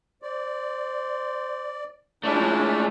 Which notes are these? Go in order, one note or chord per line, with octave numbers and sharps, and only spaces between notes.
C5 D5
G#3 A3 C#4 D4 E4 F4 D5